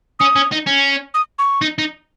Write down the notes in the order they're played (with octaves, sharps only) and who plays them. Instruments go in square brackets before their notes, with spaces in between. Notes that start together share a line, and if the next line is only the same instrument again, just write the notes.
[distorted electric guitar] C#4 [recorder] D#6
[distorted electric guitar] C#4
D#4
C#4
[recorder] D#6
C#6
[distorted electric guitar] D#4
D#4